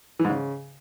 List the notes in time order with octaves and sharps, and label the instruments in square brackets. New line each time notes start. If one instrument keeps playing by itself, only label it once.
[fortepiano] E3
G#2
C#3